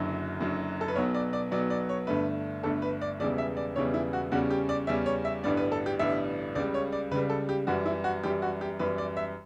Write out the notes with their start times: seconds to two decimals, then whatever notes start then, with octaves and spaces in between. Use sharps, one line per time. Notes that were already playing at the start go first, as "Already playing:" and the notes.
Already playing: F#1 F#2 D3 F#3
0.40 F#1 F#2 D3 F#3
0.81 A4
0.88 B4
0.95 B1 B2 F#3 B3 C#5
1.14 D5
1.33 D5
1.51 B1 B2 F#3 B3 D5
1.70 D5
1.89 C#5
2.07 G1 G2 D3 A3 B4
2.63 G1 G2 D3 A3 A4
2.82 B4
3.01 D5
3.20 E1 E2 C#3 E3 G3 D5
3.38 E5
3.57 D5
3.76 E1 E2 C#3 E3 G3 C#5
3.94 E4
4.13 F#4
4.32 E2 C#3 G3 C#4 F#4
4.50 G4
4.69 D5
4.87 E2 C#3 G3 C#4 E5
5.06 C#5
5.25 E5
5.43 A1 G2 D3 G3 B3 D5
5.57 B4
5.72 A4
5.86 G4
5.99 A1 G2 D3 G3 B3 E5
6.55 C#2 C#3 G3 D5
6.74 C#5
6.92 D5
7.11 C#2 C#3 G3 B4
7.30 A4
7.49 G4
7.67 F#2 E3 G3 F#4
7.86 E4
8.04 F#4
8.23 F#2 E3 G3 G4
8.42 F#4
8.61 G4
8.79 F#2 E3 G3 B4
8.98 D5
9.17 E5